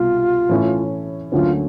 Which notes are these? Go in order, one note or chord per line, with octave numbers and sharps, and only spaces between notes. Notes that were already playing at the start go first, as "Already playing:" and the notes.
Already playing: C2 B2 G3 F4
A2 E3 A3 C#4 E4
D2 D3 F#3 A#3 C#4 F4